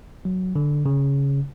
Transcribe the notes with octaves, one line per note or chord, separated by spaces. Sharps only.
F#3
D3
C#3